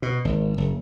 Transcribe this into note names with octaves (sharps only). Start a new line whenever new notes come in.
B2
G#1
F#1